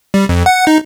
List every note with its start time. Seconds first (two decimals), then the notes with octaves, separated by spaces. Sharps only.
0.14 G3
0.29 F2
0.46 F#5
0.67 D#4